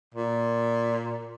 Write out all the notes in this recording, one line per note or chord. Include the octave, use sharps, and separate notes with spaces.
A#2